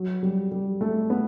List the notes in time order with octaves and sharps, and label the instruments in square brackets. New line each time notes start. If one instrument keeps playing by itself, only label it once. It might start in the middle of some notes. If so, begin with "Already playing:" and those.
Already playing: [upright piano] F#3
G3
G3
A3
B3